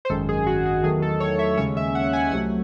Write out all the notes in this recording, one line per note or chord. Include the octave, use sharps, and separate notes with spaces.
C5
G#1 F#2 D#3 G#3 A4
G#4
F#4
G#4
E2 D#3 F#3 A3 G#4
A4
C#5
E5
D#2 C#3 G#3 C#4 C#5
E5
F#5
G#5
C2 C3 F#3 A3 F#5